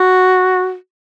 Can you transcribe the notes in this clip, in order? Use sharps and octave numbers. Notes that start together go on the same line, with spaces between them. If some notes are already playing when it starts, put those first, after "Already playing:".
Already playing: F#4